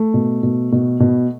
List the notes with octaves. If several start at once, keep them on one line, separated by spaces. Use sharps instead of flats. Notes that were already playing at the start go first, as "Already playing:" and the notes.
Already playing: A3
B2
B2
B2
B2